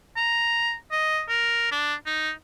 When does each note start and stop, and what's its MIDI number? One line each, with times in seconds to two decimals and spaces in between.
0.17 0.75 82
0.92 1.23 75
1.29 1.71 70
1.72 1.95 62
2.06 2.32 63